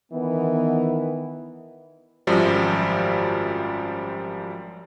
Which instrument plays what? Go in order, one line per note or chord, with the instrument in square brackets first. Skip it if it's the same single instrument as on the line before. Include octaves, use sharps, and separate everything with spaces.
[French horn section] D#3 E3 B3
[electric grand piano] G#1 F#2 F3 G3